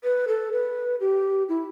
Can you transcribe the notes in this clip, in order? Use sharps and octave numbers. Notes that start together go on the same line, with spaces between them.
B4
A4
B4
G4
E4